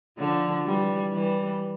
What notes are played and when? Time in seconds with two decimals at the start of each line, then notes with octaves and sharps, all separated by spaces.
0.19 D3 F3
0.66 E3 G3
1.13 E3 G3